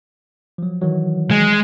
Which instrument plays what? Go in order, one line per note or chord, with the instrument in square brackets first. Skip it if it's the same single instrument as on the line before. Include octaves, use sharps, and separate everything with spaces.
[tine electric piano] F3 F#3
D#3 E3 F#3
[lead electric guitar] G#3